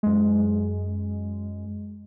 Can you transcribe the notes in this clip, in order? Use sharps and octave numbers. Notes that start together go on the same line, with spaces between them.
F#2 G#3